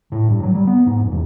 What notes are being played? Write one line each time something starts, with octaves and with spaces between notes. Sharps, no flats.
A2
G2
F#3
G3
B3
G#2
F1
E2